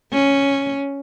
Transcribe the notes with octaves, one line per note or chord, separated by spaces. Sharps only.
C#4